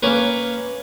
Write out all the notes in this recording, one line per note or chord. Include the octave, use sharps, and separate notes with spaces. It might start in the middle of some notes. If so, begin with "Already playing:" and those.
A#3 C#4 A#4 B4